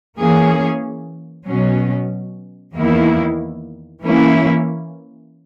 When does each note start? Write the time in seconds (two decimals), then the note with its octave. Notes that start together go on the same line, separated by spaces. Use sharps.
0.18 E3 A#3 C#4 G#4
1.47 B2 F#3 C#4
2.74 E2 D#3 A#3 E4
4.03 E3 A#3 C#4 E4